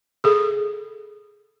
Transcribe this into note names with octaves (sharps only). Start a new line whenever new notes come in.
G#4 A4